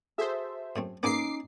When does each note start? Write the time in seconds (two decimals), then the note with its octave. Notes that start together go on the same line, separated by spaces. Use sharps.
0.18 F#4 G#4 A4 C5 E5
0.76 F#2 A3 C4
1.03 G#3 A#3 B3 C#4 D#4 D6 C7